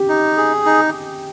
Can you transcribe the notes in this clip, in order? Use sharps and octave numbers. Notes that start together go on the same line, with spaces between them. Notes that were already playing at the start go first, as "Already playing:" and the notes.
Already playing: G4
D#4
G#4
D#4